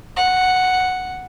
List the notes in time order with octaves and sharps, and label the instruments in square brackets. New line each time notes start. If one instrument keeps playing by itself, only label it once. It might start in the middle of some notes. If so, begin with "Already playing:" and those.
[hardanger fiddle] F#5